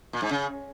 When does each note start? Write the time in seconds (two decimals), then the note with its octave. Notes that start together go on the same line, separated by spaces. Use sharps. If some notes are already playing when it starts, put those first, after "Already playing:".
0.13 A#2
0.22 G#2
0.31 C#3